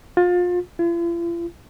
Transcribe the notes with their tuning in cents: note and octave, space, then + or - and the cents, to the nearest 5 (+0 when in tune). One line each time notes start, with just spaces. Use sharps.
F4 +30
F4 -45